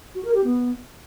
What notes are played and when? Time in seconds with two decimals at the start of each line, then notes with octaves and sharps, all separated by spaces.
0.15 F#4
0.25 A#4
0.34 G4
0.44 B3